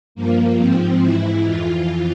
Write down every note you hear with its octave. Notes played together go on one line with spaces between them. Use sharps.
G2 F3 A#3
G#2 F3 C4
G#2 E3 E4
F2 E3 F4